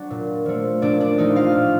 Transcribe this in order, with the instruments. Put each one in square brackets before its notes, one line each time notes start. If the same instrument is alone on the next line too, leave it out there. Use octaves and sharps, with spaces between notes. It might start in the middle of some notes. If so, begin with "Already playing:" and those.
Already playing: [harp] F#3 D4 D5
A#2
F3 A3
A#2 D4 D5
D4 D5
F3 A3 D#4 D#5
F4 F5
A2